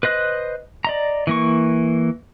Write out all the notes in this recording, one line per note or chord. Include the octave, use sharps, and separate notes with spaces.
B4 C5 D#5 F#6
D5 D#5 A#5
E3 A#3 C#6